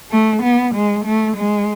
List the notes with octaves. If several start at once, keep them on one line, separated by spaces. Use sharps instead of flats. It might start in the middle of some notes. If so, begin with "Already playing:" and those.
A3
B3
G#3
A3
G#3